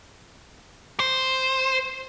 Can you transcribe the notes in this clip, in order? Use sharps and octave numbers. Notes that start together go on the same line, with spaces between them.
C5